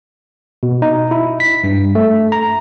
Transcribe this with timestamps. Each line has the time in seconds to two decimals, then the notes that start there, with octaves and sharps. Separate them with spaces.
0.63 B2
0.82 D#4
1.11 E4
1.40 B6
1.64 G2
1.95 A3
2.32 A#5